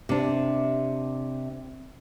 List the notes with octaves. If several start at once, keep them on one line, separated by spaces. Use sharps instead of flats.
C3 D4